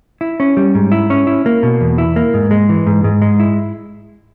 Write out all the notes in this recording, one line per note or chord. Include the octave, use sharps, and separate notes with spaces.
E4
C#4
G3
G#2
E4
C#4
E4
A#3
B2
E2
E4
A#3
G#2
G#3
E3
G#2
G#2
G#3
E4